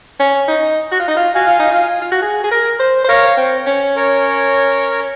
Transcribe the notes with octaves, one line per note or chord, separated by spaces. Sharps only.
C#4
D#4
F#4
F4
D#4
F4
F#4 F5 G#5
F4
D#4
F4
F4
F#4
G#4
G#4
A#4
C5
C5
A#4 C#5 F5
C4
C#4
A#4 C#5